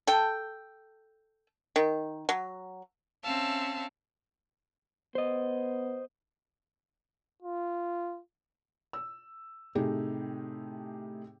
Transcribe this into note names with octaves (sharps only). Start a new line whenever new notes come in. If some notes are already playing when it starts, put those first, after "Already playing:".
A4 G5
D#3
F#3
C4 C#4 E5 F5 A5
B3 C5 D#5
F4
E6
A2 C3 A3 D#4 G4 G#4